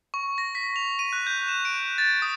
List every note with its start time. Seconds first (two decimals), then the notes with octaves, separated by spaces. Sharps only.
0.14 C#6
0.38 A#6
0.55 B6
0.76 F7
0.99 D#7
1.13 F#6
1.27 G6
1.48 E7
1.65 D7
1.98 A6
2.22 D#6